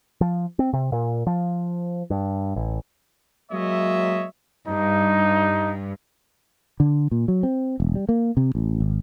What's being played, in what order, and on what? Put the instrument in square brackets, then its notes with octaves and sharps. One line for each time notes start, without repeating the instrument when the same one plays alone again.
[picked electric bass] F3
C4
C3
A#2
F3
G2
A1
[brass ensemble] F#3 G#3 A#3 C#5 D#5 E5
[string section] G2 [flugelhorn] D#4
[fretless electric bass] D3
A#2
F#3
C4
E1
G3
A#3
C3
A1
G#1